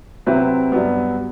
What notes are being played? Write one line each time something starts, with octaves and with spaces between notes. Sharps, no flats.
C3 F#3 C4 E4 B4
G2 F#3 B3